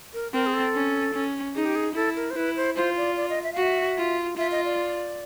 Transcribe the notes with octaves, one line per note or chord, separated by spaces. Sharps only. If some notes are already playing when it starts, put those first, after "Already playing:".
A#4
C4 A#4
G#4
A4
C#4
C#4
D#4 G#4
G4
G#4
E4 A4
A#4
C5
E4 B4
C5
F4 C5
D5
D5
D#5
E5
F#4 F5
E5
F4
F4 E5
D#5
D5